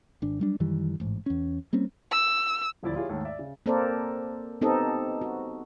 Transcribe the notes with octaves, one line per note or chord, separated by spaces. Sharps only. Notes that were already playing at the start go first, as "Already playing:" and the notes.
G#1 D4
F#3 G3 D4
F#2 D#3 E3 G3
A1 G#2
E2 C#4
G3 A#3 C4 C#4
E6
D#1 D2 F3 E4 D5 A6
E4 F4 G4 G#4 C#5
D#2 G#2 A3 C#5
D5 E5
C#3
A#3 C4 A4 A#4 C5 D5
B3 C4 D#4 G4 A4 D#5
F#4